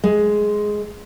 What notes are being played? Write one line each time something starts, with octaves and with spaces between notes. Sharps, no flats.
G#3